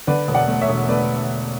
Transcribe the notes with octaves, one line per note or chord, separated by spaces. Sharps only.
D3 B4 D5
E1
D5 F#5
A3
C#5 E5
E1
A3 B4 D5